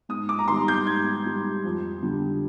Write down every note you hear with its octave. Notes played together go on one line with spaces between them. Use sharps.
G#2 D#6
D6
A#5
D#3 G3 C6
G6
G#2 G#6
D#3 G3
F2
D3 G3